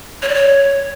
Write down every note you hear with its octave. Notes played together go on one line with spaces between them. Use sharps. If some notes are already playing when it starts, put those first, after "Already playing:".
C#5
D5
C#5